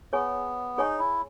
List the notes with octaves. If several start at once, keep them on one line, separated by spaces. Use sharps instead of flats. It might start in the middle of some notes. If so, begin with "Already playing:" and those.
B3 G#4 C#5 G#5 C#6
D#4 G#4 C#5 G#5 C#6
E4